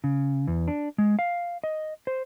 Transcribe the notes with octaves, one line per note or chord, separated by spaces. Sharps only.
C#3
E2
D4
G#3
F5
D#5
C5